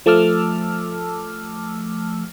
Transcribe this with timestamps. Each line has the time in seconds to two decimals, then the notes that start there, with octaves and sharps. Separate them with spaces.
0.06 F3 A3 A5 D6 E6 F6